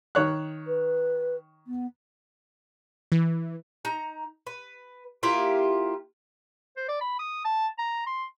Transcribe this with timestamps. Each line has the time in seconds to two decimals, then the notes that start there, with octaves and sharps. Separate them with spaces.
0.15 D#3 C#5 F#6
0.67 B4
1.67 B3
3.12 E3
3.85 D#4 A#5
4.47 B4
5.23 A#3 E4 F4 G4
6.76 C5
6.88 D5
7.01 B5
7.19 D#6
7.45 A5
7.78 A#5
8.06 C6